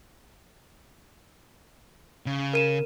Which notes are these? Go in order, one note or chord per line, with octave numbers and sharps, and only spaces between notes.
C#3
A#4 D#7 E7